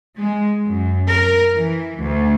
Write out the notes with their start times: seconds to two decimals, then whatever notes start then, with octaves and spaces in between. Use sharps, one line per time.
0.17 G#3
0.65 F#2
1.09 A#4
1.55 E3
2.01 D2